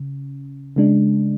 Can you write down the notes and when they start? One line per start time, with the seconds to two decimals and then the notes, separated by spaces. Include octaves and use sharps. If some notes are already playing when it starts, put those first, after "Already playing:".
Already playing: C#3
0.76 C#3 G#3 D4